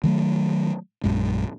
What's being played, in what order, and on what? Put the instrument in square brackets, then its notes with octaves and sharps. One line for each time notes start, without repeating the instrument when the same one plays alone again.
[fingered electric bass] D#3 F#3 A3
A#1 F#2 G#3